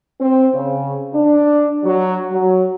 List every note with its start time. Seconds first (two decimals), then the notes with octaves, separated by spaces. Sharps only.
0.19 C4
0.54 C#3
1.14 D4
1.84 F#3
2.31 F#3